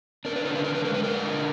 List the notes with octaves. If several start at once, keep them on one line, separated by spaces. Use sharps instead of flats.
D4 A#4
B4
D3 A#4
B4
D3 A#4
B4
G#3 A#4
B4
D4 A#4
D3